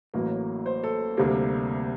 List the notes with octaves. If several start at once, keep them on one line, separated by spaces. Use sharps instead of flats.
A1 A2 F#3 A#3
C5
A4
D2 C3 G3 A#3